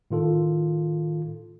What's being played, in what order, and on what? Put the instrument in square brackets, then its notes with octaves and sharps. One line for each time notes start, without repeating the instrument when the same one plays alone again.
[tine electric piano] A2 D#3 F4 A4